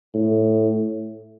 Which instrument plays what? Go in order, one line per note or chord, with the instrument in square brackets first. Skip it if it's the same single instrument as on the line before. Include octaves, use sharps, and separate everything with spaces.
[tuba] A2